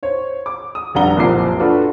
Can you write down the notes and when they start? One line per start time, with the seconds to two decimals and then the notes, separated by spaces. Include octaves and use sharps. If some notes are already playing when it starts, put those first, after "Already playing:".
0.03 C5 C#5
0.46 D6
0.75 D#6
0.95 F1 G2 G3 F#5 A#5 G7
1.16 F#1 C2 A#2 F3 D6 C7
1.60 D4 F4 F#4 A4 B4 D5